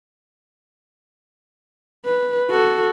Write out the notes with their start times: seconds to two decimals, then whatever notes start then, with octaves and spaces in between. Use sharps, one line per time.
2.05 B4
2.51 F#4 A4